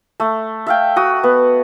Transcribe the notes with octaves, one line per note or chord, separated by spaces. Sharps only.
A3
E5 F5 G5
F#4 D#6
B3